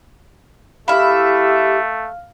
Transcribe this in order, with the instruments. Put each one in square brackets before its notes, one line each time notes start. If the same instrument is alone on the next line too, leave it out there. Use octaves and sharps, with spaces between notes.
[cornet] A3 [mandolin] E4 E5 [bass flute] G4 [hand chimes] F5 F6